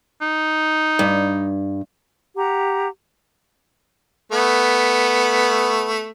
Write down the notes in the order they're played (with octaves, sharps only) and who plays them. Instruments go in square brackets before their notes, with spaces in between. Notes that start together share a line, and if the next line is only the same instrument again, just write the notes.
[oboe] D#4
[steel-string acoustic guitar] G2
[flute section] G4 F#5 A#5
[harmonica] A3 B3